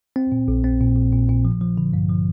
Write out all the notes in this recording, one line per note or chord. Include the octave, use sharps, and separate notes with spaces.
C4
A#2
A#1
C4
A#2
A#1
A#2
A#2
F3
F3
D3
G2
F3